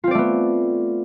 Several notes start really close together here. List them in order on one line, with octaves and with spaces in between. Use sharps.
F4 C4 D5 A3 B3